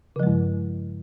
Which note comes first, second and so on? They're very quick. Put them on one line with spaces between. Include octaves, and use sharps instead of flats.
C#3 F3 G#3 G2